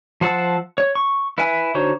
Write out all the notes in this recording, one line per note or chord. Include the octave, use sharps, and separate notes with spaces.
F3 C5 F#5 A5 E6
C#5
C#6
E4 B4 E5 G#5
D3 D#4 F#4 C5 C#5